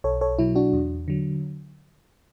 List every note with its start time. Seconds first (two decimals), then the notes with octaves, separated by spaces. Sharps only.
0.04 B1 A4 C#5
0.21 A4 C#5
0.38 B2 F#3 E4
0.55 D4 F#4
0.73 E2
1.08 D3 F#3